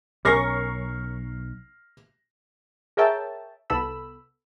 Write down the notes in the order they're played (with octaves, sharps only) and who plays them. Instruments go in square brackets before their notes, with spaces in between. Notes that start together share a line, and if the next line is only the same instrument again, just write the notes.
[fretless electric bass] B1 [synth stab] C#4 A#4 C#6 [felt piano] F6 A#6 C7
[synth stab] G#4 A#4 C#5 E5 G5 A5
C2 B3 A4 B5 E6